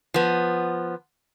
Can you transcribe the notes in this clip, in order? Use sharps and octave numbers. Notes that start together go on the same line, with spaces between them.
F3 B3